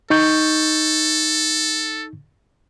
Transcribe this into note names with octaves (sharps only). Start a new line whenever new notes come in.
D#4 A4 C#6 G6